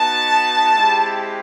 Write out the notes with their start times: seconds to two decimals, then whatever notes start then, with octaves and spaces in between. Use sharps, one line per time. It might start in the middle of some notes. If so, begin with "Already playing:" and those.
Already playing: B3 D#4 F#4 A5
0.73 G#3 C4 E4 G4